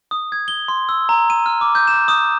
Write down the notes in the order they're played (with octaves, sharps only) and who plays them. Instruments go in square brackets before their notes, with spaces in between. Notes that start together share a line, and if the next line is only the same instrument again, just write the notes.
[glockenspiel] D#6
G#6
G7
C6
E6
A#5
D#7
F6
D6
G6
E7
D#6